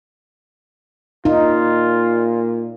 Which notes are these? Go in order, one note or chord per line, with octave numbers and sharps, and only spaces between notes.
A#2 D#4 F4